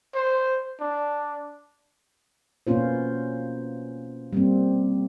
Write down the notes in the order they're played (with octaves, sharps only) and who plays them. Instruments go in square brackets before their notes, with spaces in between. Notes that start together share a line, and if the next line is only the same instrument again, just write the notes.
[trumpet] C5
D4
[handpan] B2 A#3 B3 C#4 F4 C5
G3 A#3 C4